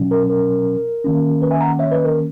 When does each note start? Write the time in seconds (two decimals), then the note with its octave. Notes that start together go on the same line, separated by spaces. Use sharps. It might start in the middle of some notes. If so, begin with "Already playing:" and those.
Already playing: B2 F#3 C#4
0.11 A#4
0.29 A#4
1.04 D#3 A#3 C#4
1.42 B4
1.51 E5 G#5
1.61 F#5 A#5
1.79 C#5 E5
1.91 B4 D#5
2.04 A#4